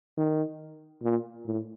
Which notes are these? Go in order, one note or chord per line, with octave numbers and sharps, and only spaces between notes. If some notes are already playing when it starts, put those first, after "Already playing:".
D#3
A#2
A2